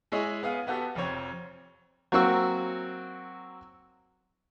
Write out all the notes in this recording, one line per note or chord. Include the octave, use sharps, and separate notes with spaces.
G#3 E4 G#4 C#5 D#5 G#5
B3 G#4 F5
B3 F#4 G4 A4
F1 F2 C4 C#5 G#6
F#3 A#3 C4 F#4 C#6 E6